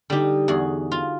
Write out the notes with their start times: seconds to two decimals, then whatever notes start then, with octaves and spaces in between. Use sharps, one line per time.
0.10 D3 G3 D#4 G4
0.48 E2 F#4 G#4
0.92 F4